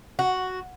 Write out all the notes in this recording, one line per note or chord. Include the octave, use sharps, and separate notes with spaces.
F#4